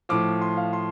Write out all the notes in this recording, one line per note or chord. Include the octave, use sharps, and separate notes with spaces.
A2 F3 D6
C6
F5
C6